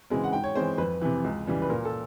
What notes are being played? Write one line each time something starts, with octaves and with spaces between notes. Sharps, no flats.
C#3 E3 G#3 C4
F#5
G#2 G5
C#5
E3 G#3 C4 C5
F2 B4
C3 E3
C#2
C#3 E3 G3
B4
A#2 A#4
A4